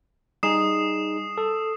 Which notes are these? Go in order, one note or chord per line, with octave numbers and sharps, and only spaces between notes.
G3 D#4 G#4 D#6 C7 E7
A4